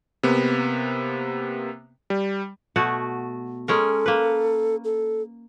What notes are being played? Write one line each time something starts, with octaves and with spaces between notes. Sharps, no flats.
C3 A#3 B3
G3
B2 A3 F#4
G#3 C#4 A4 A#4
A#3 B4
A4